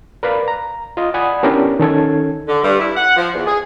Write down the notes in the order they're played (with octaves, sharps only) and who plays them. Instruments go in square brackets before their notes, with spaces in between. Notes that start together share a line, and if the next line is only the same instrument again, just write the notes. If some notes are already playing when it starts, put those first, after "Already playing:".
[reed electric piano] A#4 B4 D5 F5 B5
A#5
F4 D#5
D5 F#5 G#5 B5 D#6
B3 C#4 D4 E4 G4 A#4
D#3 C#4 A4 G#6
[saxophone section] D3
G2
E4
F#5
F3
E2
G#4